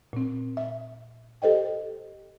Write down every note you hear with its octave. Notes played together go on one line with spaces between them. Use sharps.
A#2 C4
E5
G4 A4 C5 D#5 G5